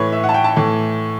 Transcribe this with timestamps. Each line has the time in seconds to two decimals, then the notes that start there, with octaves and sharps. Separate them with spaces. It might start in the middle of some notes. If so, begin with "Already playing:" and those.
Already playing: A2 E3 B4 C#5
0.12 E5
0.24 F#5
0.29 A5
0.34 G5
0.44 A5
0.56 A2 E3